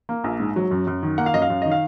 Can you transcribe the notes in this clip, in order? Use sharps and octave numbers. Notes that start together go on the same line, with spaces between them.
A#3
A#1
G#2
F#3
F#2
F#2
D#3
A#3 F#5
F5
F#2 D#5
F5
F#2
D#3 D#5
F5